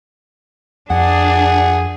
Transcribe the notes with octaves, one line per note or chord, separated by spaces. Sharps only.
F2 D4 G#4 F#5